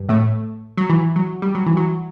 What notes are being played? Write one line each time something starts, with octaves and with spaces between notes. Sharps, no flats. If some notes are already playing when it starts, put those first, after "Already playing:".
Already playing: G2
A2 A3
F#3
E3
F#3
G3
F#3
E3
F#3